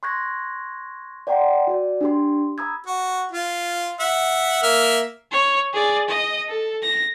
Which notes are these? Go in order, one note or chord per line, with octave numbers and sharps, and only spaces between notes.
C6 C#6 F#6 G#6 A#6
D5 F#5 G5 A#5 C6
F#4 D5
D4 G4 C6
A#5 B5 D#6 E6 G#6
F#4
F4
E5 F#5
A#3 E5 F6
C#5
G#4 D5
D#5
A4
A#6